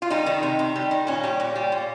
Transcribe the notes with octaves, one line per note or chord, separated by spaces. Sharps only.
F4
G3 D#4
D#3
C3
C3
G3
D#3
A#2 C#4
G3
A#2
G3
A#2